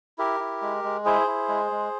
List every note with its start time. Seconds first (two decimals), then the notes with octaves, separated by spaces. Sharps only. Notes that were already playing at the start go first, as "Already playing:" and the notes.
0.18 E4 G4 A#4
0.40 E4
0.62 G#3
0.84 G#3
1.05 E4 G#4 C5
1.27 E4
1.49 G#3
1.71 G#3